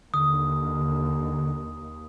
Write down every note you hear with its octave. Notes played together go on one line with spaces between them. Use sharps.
D#2 D3 D#6